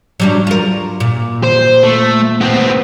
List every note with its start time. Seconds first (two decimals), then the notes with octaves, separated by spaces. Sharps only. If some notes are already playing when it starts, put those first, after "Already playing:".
0.20 F#3 G3 D4
0.47 F4 A#4
1.00 A#2
1.44 C5
1.83 A3
2.41 B3 C4